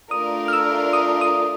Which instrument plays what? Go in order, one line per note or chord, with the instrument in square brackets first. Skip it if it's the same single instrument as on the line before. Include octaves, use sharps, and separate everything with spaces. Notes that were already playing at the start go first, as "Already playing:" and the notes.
[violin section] A3 D4 F4 A#4 D5 [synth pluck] D#6
[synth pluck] F6
E6
D#6
D#6